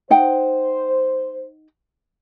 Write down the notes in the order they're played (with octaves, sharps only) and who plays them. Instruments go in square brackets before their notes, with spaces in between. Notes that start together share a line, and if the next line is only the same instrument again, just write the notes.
[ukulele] D#4 F#5 G5 [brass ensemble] C5